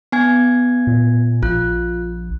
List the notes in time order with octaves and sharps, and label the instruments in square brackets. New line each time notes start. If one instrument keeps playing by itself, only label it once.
[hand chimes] B3 G#5 G#6
[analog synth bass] A#2
[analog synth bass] A#1 [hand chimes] F4 F#6